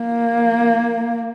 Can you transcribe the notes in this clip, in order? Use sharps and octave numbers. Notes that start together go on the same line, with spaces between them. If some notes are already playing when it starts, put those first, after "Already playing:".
Already playing: A#3